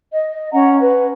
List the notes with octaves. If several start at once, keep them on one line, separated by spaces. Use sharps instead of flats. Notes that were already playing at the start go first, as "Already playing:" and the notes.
D#5
C#4 F#5 A#5
B4